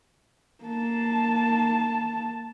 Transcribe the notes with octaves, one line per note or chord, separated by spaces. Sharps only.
A#3 A5